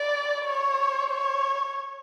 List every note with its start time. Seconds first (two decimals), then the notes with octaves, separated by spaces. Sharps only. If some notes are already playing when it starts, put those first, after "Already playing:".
Already playing: D5
0.45 C#5
1.11 C#5